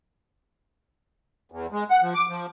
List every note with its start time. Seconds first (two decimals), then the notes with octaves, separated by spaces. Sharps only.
1.52 E2
1.72 G#3
1.91 F#5
2.02 F3
2.15 D6
2.29 F3